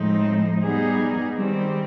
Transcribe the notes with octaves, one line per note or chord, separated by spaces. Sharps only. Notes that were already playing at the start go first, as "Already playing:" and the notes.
Already playing: A2 F3 G#3 C4 D#4
G3 B3 D#4 G#4
D#3 G3 C4